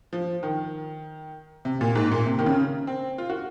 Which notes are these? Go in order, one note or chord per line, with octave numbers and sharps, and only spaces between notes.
F3
D#3
C3
A#2
G#2
A#2
C3
D#3
C#3
C4
F4
F#4